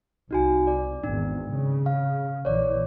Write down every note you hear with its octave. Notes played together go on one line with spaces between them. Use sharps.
C2 D#4 F#4 G#5
D5
G#1 E2 D4
C#3
F5
A#1 E3 C#5 D5